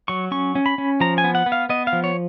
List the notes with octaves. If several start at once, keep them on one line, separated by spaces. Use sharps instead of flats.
F#3 C#6
C#4 C#6
C#4
B5
C#4
F3 A#5
G#5
B3
F#5
B3
F5
B3 D#5
F5
F3
C#5